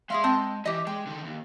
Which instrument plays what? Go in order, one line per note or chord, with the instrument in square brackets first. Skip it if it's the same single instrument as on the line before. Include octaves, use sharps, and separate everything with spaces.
[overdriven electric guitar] G#3 C6 [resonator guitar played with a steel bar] G#4 E5 F5
[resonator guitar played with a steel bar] C4 A5
[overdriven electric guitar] E3 [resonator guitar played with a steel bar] G4 D#5
[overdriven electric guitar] G#3 [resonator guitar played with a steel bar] G5
[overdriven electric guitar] D3 D#3
D#2